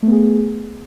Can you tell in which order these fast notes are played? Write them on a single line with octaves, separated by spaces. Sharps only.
A3 B3 G#4